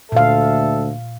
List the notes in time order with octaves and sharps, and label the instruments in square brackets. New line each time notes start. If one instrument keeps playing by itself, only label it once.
[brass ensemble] D2 A4 E5 [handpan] A#2 F5